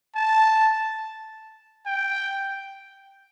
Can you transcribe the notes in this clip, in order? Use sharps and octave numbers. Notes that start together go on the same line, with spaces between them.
A5
G5